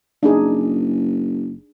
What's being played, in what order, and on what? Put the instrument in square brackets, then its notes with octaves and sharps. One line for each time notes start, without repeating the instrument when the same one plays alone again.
[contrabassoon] F#1 [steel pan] D4 D#4 G#4